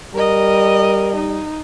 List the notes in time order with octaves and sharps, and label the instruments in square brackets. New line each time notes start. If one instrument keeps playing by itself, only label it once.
[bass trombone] G3 [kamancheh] A#4 D#5
[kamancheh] D#4